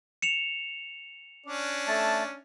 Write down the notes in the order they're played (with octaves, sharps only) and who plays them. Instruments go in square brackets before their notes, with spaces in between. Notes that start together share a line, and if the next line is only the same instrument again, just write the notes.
[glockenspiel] C#7 E7 F7
[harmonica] C#4 D4 D5
[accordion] A3 A5